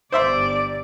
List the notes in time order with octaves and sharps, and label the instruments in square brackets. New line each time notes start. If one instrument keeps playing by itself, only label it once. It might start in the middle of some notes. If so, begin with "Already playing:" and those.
[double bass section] G1 [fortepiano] C5 E5 C6 [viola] D5